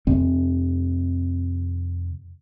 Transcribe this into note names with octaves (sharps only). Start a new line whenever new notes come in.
F2 C3 C4